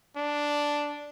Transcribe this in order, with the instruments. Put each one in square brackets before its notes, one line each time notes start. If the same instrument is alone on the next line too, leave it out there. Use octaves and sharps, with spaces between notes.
[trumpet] D4